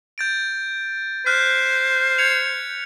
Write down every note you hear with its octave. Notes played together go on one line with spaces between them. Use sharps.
G6 A6 D7
C5 F6 F#6 B6
G#6 C#7 F7